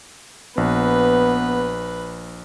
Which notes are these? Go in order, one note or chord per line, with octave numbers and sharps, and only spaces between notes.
A#1 B3 B4